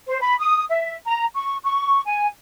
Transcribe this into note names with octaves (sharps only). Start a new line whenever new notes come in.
C5
B5
D#6
E5
A#5
C#6
C#6
G#5